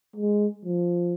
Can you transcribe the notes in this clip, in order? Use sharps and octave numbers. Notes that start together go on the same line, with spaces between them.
G#3
F3